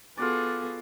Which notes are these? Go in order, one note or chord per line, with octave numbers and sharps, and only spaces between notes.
B3 F4 F#4 G#4 A4 D5